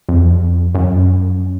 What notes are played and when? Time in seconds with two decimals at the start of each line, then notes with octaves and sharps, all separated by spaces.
0.09 F2
0.75 F#2